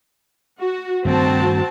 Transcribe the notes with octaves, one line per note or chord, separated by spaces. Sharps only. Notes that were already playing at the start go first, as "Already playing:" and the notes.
F#4
G2 D#3 A3 C4 F#4 A5